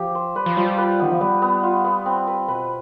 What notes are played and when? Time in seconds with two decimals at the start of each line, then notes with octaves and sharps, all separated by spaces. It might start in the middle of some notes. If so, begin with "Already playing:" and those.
Already playing: F3 G4
0.15 C5
0.35 G3 B4
0.46 F3
0.57 F3 G3
0.78 B4
1.00 D#3 B3
1.11 F3
1.21 G3 B3
1.42 B3
1.63 F4
1.85 B3
2.06 C4
2.27 B4
2.48 B2 B4